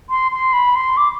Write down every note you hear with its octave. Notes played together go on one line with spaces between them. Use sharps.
C6
C6
B5
C6
D6